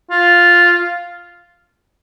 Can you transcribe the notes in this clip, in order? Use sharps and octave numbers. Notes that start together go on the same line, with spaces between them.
F4